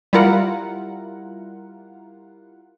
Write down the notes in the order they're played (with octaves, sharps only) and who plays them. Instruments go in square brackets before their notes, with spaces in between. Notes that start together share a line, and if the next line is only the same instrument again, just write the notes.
[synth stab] G3 E4 F4 A#4 F#5